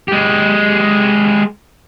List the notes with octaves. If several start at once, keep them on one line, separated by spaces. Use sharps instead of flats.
G#3 G4